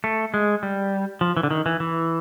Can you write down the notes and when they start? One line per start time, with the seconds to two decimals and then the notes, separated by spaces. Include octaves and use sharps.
0.04 A3
0.34 G#3
0.63 G3
1.21 F3
1.37 E3
1.43 D3
1.51 D#3
1.66 E3
1.80 E3